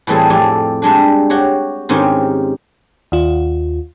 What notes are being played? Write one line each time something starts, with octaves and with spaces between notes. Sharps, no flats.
A2 E3 G3 C4 G#4 A4
F2 A2 G4 D5 G#5
G3 G#3 D4
F#4 G4 C#5
G#2 D#3 C4 C#4 G4 G#5
D#2 F4